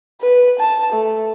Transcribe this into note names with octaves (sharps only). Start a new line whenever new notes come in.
B4
A5
A3